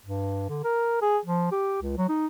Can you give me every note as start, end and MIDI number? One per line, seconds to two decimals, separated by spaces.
0.06 0.46 43
0.49 0.64 50
0.64 0.98 70
1.02 1.18 68
1.25 1.50 53
1.51 1.80 67
1.82 1.95 37
1.97 2.06 54
2.09 2.26 63